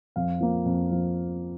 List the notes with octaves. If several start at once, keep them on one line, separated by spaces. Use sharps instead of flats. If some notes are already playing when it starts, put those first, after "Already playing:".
F2 F5
F3 A#3
F2
F3